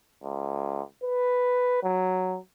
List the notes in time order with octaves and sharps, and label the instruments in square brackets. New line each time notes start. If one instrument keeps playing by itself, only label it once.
[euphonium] C#2
B4
F#3